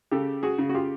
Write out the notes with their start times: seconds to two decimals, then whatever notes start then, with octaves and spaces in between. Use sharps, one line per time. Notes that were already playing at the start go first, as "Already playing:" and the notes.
0.11 C#3 G4 A4
0.43 F#4 G#4
0.58 C#3
0.69 F#4
0.74 F4 G4